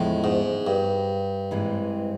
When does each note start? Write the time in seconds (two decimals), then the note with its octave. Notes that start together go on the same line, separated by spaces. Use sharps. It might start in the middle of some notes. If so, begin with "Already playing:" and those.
Already playing: E2 A2 C#3 F3 G#3
0.24 G#2
0.67 G2
1.51 G#2 E3 G#3 C4